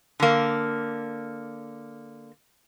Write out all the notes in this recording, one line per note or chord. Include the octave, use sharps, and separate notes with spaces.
D3 A#3